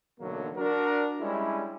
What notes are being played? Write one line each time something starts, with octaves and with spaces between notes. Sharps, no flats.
B1 E2 A2 D3 F#3 A#3
D4 F#4 A#4
G3 G#3 C#4 D4 E4